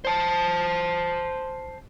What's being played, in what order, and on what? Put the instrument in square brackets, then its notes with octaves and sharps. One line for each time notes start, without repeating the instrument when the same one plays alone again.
[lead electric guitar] C5 A5